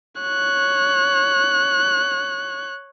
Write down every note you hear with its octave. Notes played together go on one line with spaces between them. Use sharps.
C#5 F#6